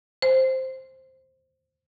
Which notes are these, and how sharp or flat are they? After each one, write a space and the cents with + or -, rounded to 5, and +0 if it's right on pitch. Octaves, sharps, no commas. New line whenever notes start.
C5 +5